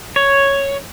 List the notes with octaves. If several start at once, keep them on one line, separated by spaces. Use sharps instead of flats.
C#5